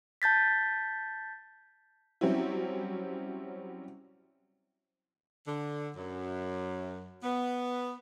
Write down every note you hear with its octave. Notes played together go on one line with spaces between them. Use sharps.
A5 G6 A6 B6
F#3 G3 C4 C#4 E4
D3
F#2
B3